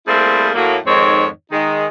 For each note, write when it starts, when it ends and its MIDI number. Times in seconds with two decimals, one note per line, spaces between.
0.07 0.48 55
0.07 0.48 57
0.07 0.48 58
0.07 0.48 60
0.07 0.48 64
0.07 0.48 68
0.54 0.76 45
0.54 0.76 54
0.54 0.76 58
0.86 1.26 41
0.86 1.26 44
0.86 1.26 51
0.86 1.26 60
0.86 1.26 73
1.51 1.85 51
1.51 1.85 56
1.51 1.85 63